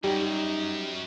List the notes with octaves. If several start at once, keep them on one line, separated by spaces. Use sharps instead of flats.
F#2 G3 D#4 G4